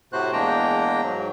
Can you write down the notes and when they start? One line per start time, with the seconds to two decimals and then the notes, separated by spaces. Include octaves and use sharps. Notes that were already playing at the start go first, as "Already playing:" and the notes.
0.13 A2 C3 F#4 C5 F#6
0.33 E2 G#3 A#3 D4 G5 A#5
1.03 G#2 F#3